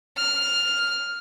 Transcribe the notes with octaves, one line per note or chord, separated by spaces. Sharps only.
F6